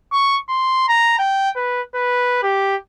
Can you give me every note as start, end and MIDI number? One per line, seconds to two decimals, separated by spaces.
0.13 0.37 85
0.49 0.88 84
0.89 1.16 82
1.19 1.50 79
1.56 1.82 71
1.95 2.38 71
2.43 2.76 67